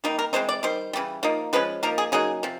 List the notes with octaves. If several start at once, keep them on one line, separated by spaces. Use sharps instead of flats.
D#3 G3 A#3 D#4
A#4
E3 G#3 C4 D#4 C5
D5
D#3 G3 C5
C#3 E3 G3
F3 A#3 D#4
F3 G#3 C#4 B4
F3 A#3 D#4 A#4
G#4
C#3 F#3 A#3 D#4 G#4
C3 F3